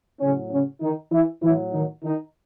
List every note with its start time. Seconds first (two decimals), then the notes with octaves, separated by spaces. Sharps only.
0.20 A2 C#3 F#3 C#4
0.51 C#3 C#4
0.81 D#3 D#4
1.12 E3 E4
1.42 A2 E3 F#3 E4
1.73 D#3 D#4
2.03 D#3 D#4